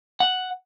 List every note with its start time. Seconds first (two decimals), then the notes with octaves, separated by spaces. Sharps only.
0.20 F#5